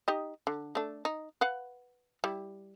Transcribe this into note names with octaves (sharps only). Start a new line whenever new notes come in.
D#4 G4 D#5
D3
A3 D4
D#4
B4 F5 F#5
G3 E4